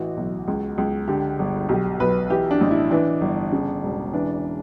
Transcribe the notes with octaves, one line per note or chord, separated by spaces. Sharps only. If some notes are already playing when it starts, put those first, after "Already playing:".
Already playing: A1 E3 F#4
B1
C#2
C#2
D3 G4
G1
B1 G4
B1 B4
E3 G4
D4
A1
E4
E3 D4
G1
C#3
E1
E3 D4